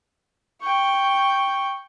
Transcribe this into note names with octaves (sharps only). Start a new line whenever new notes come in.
G5 C#6